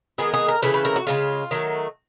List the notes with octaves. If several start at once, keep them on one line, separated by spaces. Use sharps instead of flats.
D#3 G#3 B3 G#4
G#4
A#4
C#3 E3 A3 B4
B4
A#4
F#4
C#3 F3 G#3 F4
D#3 F#3 A3